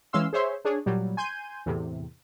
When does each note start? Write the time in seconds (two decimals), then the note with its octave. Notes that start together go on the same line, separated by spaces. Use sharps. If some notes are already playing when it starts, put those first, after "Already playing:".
0.13 E3 G#3 C#4 F5 C6 E6
0.33 G#4 C5 C#5 E5 C6
0.65 D4 G#4 C#5
0.86 A#2 F#3 G3
1.17 G#5 C6 G6 D#7
1.66 E2 A2 C3